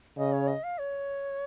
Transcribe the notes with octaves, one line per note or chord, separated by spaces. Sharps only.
C#3 D#5
C#5
D#5
F5
C#5